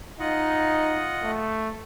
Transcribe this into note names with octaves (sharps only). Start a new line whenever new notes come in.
D#4 F4 D#5 F#5
A3